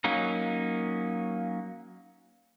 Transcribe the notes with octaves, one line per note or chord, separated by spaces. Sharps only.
F#3 A#3 C#4 D#4